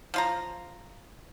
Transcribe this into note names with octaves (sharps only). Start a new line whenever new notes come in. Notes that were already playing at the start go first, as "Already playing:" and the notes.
F3 F4 A#5